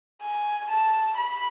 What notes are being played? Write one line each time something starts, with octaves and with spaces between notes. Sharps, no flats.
G#5
A5
B5